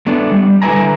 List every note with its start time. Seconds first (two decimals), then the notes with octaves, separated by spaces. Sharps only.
0.07 A3 B3 D4
0.31 G3
0.62 D3 E4 B4 E5 G#5 A#5